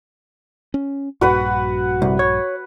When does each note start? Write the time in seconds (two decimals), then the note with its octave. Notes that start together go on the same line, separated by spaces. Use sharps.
0.74 C#4
1.21 A#1 G2 F#4 B4 F#5
2.02 C2
2.19 C#5